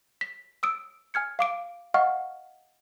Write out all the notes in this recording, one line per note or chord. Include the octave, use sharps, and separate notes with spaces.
B6
D#6 E6 D7
G#5 F6 G#6 C#7
F5 D6 D7
D#5 F5 F#5 C#6 F6